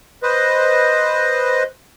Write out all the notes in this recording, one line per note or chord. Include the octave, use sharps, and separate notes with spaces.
B4 C5 D#5